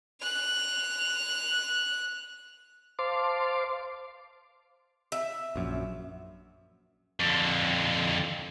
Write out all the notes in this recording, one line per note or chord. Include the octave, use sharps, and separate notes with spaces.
F#6 F7
C5 F5 A5 C6 D6
E5
A#1 F#2
F2 D3